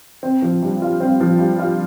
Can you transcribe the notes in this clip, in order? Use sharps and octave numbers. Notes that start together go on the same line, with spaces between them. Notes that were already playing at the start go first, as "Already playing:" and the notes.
C4
F3
G2
F4
C4
F3
G2
F4